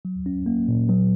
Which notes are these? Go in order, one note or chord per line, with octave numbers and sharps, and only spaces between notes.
F#3
C#4
A#3
A#2
F#3